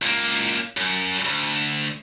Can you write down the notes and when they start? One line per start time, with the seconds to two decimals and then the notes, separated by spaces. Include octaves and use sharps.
0.02 C#2 A#3
0.77 F#2
1.25 D2